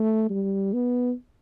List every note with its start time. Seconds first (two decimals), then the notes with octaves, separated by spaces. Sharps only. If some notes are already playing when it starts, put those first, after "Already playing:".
Already playing: A3
0.30 G3
0.74 B3